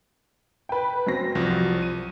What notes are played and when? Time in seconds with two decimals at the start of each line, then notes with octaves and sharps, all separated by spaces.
0.69 B4 G5
1.07 F#2 C4 A#6
1.35 C2 F3 F#3
1.83 D#7